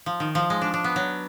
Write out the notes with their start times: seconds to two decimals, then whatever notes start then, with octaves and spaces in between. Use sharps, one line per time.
0.06 F3
0.20 D#3
0.35 F3
0.50 G#3
0.61 D4
0.74 D4
0.84 B3
0.96 F#3